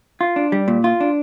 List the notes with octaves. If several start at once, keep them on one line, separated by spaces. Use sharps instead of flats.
F4
D4
G3
A#2
F4
D4